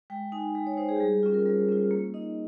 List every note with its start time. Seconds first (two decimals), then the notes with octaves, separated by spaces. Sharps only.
0.10 G#3 G5
0.32 D#4 G#5
0.55 G#3 G5
0.67 C#5
0.77 D#4 C5
0.89 G#4
0.96 G4
1.00 G3 G#4
1.23 C#4 F4
1.34 A#4
1.45 G3 C5
1.69 C#4 F4
1.91 A#3
2.14 D#4 D#5